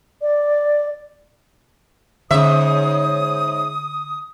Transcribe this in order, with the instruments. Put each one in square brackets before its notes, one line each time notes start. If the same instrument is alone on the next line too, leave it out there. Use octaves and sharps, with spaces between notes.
[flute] D5
[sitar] G#2 E5 [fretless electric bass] D3 C#4 [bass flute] C#5 [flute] D#6